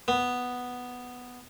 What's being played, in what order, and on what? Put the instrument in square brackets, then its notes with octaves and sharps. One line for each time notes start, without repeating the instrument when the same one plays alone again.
[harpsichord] B3